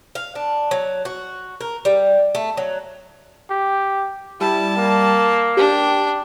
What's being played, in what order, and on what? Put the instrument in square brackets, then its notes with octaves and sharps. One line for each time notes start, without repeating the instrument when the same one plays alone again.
[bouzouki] F5
D4
F#3
F#4
A#4
G3
A3
F#3
[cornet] G4
[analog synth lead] G3 [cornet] E4 [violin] A5
[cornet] A#3
[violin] D4 [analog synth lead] G4